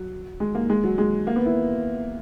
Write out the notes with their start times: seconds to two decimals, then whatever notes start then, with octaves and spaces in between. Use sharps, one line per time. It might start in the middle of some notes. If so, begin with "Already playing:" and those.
Already playing: F#3
0.40 G#3
0.55 A#3
0.70 G#3
0.84 F#3
0.98 G#3
1.27 A#3
1.36 B3
1.46 E4